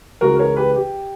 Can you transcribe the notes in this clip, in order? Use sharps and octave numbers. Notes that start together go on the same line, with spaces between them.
C#2 C#3 E3 F#4 A#4
A#4 C#5
G4 B4
G4